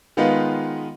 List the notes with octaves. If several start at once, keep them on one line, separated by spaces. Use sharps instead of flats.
D#3 G#3 B3 D#4 F4 B4